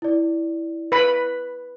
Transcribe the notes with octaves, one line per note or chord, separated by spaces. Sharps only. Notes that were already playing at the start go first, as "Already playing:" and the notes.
E4 D5
B4 B5